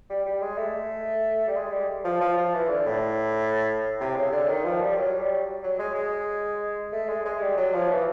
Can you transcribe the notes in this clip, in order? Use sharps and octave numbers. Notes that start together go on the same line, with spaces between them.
G3
G3
G#3
A3
G3
G#3
G3
F3
F3
F3
E3
D3
A2
C3
C#3
D3
D#3
F3
G3
F#3
G3
F#3
G#3
G#3
A3
G#3
G#3
G3
F#3
F3
E3